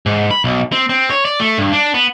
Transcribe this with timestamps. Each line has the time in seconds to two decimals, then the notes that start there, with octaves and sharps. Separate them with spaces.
0.06 G#2
0.31 B5
0.44 B1
0.72 C4
0.90 C4
1.10 C#5
1.25 D5
1.40 A3
1.58 G2
1.73 D4
1.94 B3